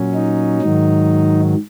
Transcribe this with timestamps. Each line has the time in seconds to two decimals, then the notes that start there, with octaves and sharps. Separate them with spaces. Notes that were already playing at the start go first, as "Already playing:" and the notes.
Already playing: A#2 F#3 C#4
0.14 D#4
0.61 G#2 D#3 F#3